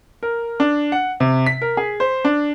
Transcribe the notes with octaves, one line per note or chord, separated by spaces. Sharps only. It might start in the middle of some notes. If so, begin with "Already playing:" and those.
A#4
D4
F#5
C3
B6
A#4
G#4
C5
D4